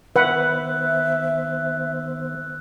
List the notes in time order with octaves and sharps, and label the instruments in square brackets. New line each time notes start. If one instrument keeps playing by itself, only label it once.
[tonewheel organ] D#3 B3 C5 [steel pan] B4 F#5 [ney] E5 [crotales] E6 F#6